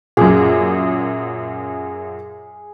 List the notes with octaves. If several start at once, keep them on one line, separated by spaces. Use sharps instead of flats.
F#2 A#2 G#4